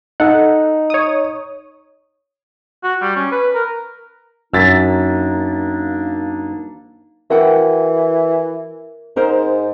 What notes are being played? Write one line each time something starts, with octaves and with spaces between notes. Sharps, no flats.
D#4 A4 F#5
C#5 D#6
F#4
G3
C#4
B4
A#4
F#2 A#3 D4 D#4 E6 A6 B6
E3 F#4 A#4 F#5 G5
G#2 D#4 A#4 C5